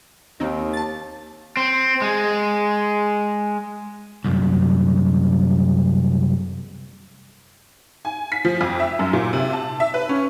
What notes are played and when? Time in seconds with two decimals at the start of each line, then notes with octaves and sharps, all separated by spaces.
0.40 D#2 D#3 C4 D#4
0.73 A5 A6
1.57 C4
2.02 G#3
4.24 C2 F#2
8.05 G#5
8.32 B6
8.45 F3
8.61 F2
8.80 E5
8.99 F#2
9.13 A#2
9.33 C3
9.53 A5
9.80 E5
9.94 B4
10.09 C#4